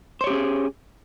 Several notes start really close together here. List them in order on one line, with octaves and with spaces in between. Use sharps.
C5 C#5 G4 C#4 G#4